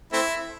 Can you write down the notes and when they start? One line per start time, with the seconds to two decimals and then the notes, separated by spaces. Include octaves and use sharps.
0.13 A3 C4 E4